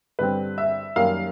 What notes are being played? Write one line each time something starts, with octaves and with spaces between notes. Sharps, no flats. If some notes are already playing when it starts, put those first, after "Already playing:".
G2 D3 G3 C4 B4
E5
F#2 D#3 G3 A#3 F5